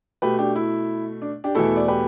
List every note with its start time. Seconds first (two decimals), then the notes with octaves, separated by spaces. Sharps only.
0.22 B2 A3 G4 B4
0.39 D4 G4
0.56 E4
1.22 D4
1.44 D4 G4
1.55 E2 B2 A3 E4 A4
1.76 D5
1.88 G4 B4